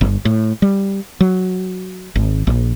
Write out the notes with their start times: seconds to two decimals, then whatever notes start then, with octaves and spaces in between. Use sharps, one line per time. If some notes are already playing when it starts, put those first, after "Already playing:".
0.01 G1
0.25 A2
0.62 G3
1.21 F#3
2.16 G#1
2.47 A#1